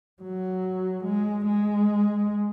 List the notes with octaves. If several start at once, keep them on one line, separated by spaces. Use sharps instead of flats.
F#3
G#3
G#3